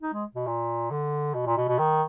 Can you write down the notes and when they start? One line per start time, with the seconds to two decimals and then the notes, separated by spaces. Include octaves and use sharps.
0.02 D#4
0.13 G#3
0.35 B2
0.47 A#2
0.91 D3
1.34 B2
1.47 A#2
1.57 B2
1.68 B2
1.79 D#3